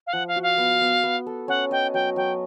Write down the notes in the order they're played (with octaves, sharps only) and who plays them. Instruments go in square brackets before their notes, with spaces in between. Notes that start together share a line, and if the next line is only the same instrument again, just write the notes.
[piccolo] F5
[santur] F3 [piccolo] F#5
[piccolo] F5
[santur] F#4
[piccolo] F5
[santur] B3
B3
B3
A4
[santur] C#4 [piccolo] F#5
[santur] D#5 [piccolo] G5
[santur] F#3 [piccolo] G5
[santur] F#3 [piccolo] G5